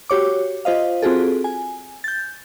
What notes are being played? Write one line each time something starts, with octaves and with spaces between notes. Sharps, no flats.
F#4 G4 C#5 D6
F4 C5 D#5 F5
C4 F4 F#4 G#4 A4
G#5
G6 A6